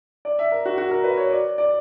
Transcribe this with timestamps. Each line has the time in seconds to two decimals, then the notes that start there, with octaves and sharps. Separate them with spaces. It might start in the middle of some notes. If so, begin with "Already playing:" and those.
0.25 D5
0.39 E5
0.52 A#4
0.66 F#4
0.78 F#4
0.91 A#4
1.04 B4
1.18 C#5
1.31 D5
1.58 D5